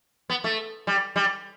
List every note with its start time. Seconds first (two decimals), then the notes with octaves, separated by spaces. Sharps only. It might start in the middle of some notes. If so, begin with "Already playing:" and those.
0.30 B3
0.44 A3
0.87 G3
1.16 G3